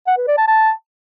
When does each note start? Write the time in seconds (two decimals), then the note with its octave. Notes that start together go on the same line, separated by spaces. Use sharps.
0.07 F#5
0.17 B4
0.27 D5
0.38 A5
0.48 A5